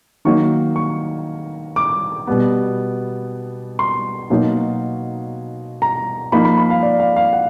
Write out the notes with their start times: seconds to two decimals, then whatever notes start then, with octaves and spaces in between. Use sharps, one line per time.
0.25 D#3 F#3 A#3 D#4 C#6
0.76 C#6
1.76 D6
2.27 B2 G3 B3
3.79 C6
4.30 B2 F#3 A#3 D#4
5.82 A#5
6.32 F3 A#3 D#4 B5
6.45 B5
6.58 B5
6.70 F5
6.83 D5
7.00 F5
7.16 F5
7.33 F#5